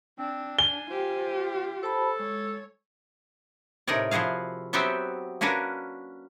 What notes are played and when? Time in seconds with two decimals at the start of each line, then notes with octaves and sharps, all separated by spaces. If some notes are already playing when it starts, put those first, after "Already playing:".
0.19 C4 D4
0.59 G#5 G7
0.90 F4 G4 C5
1.83 A4 C5 A5 B5
2.19 G#3 C#5
3.87 A2 C3 D#4 A#4 C#5 D5
4.11 F3 E4 F#4 G#4 F5
4.73 F#3 B3 C4 F#4 G4 E5
5.41 A#3 C#4 D4 F#4 A#4 B4